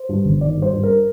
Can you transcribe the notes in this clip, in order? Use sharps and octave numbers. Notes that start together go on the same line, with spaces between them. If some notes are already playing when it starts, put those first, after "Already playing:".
Already playing: C5
G2
G1
D#3 D5
G2
C5
G2
A#4